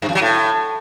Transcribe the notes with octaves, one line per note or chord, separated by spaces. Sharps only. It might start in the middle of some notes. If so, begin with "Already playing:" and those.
G2
F2
F#3
A2